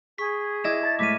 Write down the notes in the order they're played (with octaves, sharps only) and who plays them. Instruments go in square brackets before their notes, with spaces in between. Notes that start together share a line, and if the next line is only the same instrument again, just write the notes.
[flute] G#4 [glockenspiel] C#6 B6
[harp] E4 D5 D#5 [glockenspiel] G#6 A#6 E7
[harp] A5 [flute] A6
[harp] A2 G#3 F5 [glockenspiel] D6 D#7 [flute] B6